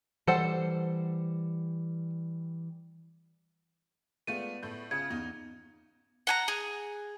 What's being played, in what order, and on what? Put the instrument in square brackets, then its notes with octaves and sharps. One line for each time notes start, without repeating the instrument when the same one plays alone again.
[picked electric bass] E3 G3 [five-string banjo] A4 C5 F#5
[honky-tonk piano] G#3 A3 F4 [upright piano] B3 D5 [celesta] D#7
[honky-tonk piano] A2 A4 G6
[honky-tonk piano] C#3 F4 [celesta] G#6 [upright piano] C#7
[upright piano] E2 [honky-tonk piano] D#4
[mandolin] F#5 G#5 A#5
G#4